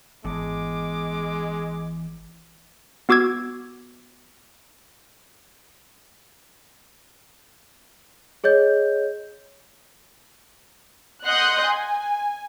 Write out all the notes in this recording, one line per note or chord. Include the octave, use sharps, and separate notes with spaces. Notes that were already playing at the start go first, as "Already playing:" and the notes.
G#1 E2 G#3 D6
B3 F#4 D6 E6 G#6
G#4 C#5 D#5 G6
D#5 F#5 C6 D#6 F#6 G6
G#5